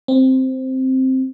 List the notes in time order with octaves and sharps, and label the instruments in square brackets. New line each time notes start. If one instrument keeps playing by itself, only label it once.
[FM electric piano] C4